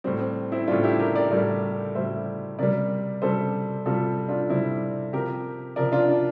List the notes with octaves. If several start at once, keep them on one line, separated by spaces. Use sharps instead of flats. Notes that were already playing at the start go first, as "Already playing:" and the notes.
A2 G3 C4
C4
C4 E4
A2 G3 D4 F4
E4 G4
G4 A#4
A#4 D5
A2 G3 A#4 D5
A2 G3 C5 E5
C3 G3 A#4 D5
C3 G3 A4 C5
C3 G3 F4 A4
D4 F4
C3 G3 C4 E4
C3 F3 G4 A#4
C3 F3 A#4 D5
D4 F4
D4